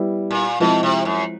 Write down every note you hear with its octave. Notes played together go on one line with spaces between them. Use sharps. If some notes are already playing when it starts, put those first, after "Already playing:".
Already playing: G3 B3 E4
A#2
B2 F3 G#3 C4 E4
C3
F#2